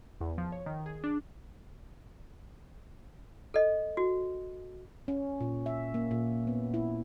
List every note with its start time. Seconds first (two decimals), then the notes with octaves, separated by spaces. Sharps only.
0.21 E2
0.38 F3
0.52 C#5
0.66 D#3
0.86 G#4
1.04 D4
3.54 A4 D#5
3.97 F#4
5.08 C#4
5.41 A#2
5.66 E5
5.94 A#3
6.11 A#2
6.47 B3
6.74 E4